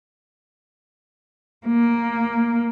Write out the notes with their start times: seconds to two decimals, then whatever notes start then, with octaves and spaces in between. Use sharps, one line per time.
1.67 A#3